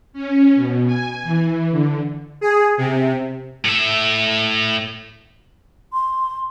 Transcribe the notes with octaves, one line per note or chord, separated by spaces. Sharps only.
C#4
B2
G#5
E3
D3
G#4
C3
A2 E5
C6